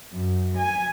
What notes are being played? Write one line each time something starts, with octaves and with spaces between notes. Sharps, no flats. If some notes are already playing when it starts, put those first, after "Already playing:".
F#2
G#5